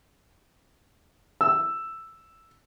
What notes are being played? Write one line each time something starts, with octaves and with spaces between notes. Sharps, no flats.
E6